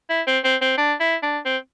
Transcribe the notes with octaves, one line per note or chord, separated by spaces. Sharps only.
E4
C4
C4
C4
D4
E4
D4
C4